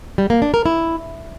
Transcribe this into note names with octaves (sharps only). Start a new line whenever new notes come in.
G3
A#3
D4
A#4
E4